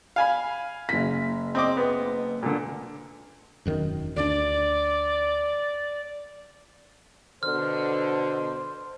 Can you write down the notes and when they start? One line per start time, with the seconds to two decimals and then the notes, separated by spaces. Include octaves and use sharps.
0.16 F5 G#5 B5
0.89 F#1 B6
1.55 C4 D#5 D6
1.77 B3
2.43 A#2 D3
3.65 E1 F#2 D#3
4.16 D2 D4 D5
7.43 B2 D3 C5 F6